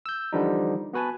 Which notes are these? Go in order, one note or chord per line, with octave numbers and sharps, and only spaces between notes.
E6 G6
D3 E3 F3 G3 D4 D#4
B3 F#4 B4 G#5 A5